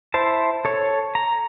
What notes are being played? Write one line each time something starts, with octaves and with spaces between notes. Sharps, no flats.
E4 C5 A5
A4 C#5
A#5